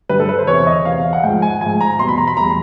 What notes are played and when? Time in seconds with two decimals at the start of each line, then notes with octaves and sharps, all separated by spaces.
0.09 G2 D3 G3 B4
0.20 A4
0.29 B4
0.38 C5
0.47 E2 C3 E3 C#5
0.66 D#5
0.85 E2 C3 E3 F5
1.13 F#5
1.23 G#2 F3 G5
1.42 G#5
1.61 G#2 F3 G#5
1.81 A#5
1.99 E2 B2 G3 C6
2.08 B5
2.18 A#5
2.27 B5
2.37 E2 B2 G3 A#5